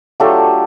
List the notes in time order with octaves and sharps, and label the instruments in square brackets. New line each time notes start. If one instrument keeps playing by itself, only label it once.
[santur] F#3 A3 D4 F4 G4 A4